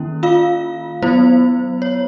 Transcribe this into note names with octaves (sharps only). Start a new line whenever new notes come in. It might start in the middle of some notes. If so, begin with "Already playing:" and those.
Already playing: D#3 A#3 C#4 E4
F4 F5
F#3 B3 E4 C5
C#5